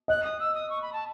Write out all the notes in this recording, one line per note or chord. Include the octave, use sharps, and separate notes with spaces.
D#5 F#6
D#6
E6
D#6
C#6
B5
A5